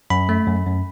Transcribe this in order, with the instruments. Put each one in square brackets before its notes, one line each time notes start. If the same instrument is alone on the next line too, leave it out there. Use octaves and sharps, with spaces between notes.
[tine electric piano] F#2 B5
A3
F#2
F#2